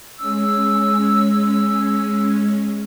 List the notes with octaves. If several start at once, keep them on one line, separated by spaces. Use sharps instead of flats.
G#3 C#4 E6